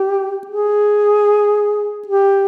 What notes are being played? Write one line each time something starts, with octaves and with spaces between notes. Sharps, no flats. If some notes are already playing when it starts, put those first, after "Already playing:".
Already playing: G4
G#4
G4